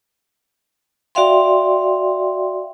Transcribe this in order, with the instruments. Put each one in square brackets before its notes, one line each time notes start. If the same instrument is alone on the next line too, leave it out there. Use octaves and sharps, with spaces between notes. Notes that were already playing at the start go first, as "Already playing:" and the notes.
[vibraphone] F#4 D5 E5 F5 G5 C6